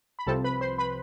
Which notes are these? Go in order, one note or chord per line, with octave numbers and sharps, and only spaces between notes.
B5
C2 C3 F3 C4 A4 A5
B4 B5
C5 C6
B4 B5